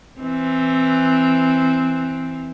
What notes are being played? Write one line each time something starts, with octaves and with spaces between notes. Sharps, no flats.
E3 C4